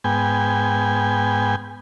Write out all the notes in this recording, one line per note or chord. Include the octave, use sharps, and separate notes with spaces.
G#2 B3 G5 G#5